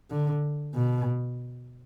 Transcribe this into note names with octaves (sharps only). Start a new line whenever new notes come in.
D3
B2